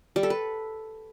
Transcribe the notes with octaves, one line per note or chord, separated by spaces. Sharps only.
G3
A4
B4